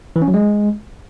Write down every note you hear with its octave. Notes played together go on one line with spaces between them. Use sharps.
E3
C#4
F#3
G#3